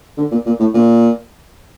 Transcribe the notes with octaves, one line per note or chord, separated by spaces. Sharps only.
D3
A#2
A#2
A2
A#2